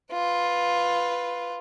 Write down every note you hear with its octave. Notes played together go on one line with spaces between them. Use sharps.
F4 B4